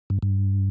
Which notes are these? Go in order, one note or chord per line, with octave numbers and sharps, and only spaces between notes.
G2
G2